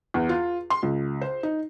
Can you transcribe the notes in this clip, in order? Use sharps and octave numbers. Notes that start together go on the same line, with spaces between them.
E2
F4
C6
C#2
C5
D#4